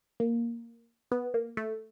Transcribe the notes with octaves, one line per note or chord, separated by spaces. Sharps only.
A#3
B3
A#3
A3